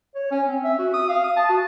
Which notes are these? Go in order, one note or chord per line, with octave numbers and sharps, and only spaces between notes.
C#5
C#4
C4
E5
F#4
D#6
F5
D#6
A5
F#4